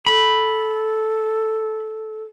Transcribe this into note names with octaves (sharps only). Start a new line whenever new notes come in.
A4 B5